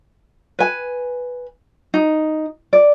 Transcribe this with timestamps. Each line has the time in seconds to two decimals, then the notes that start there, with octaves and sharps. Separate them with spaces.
0.59 B4 G#5
1.94 D#4
2.73 D5